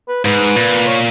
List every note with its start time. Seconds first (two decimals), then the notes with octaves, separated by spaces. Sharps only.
0.08 B4
0.24 G#2 B4
0.56 A#2
0.87 C#5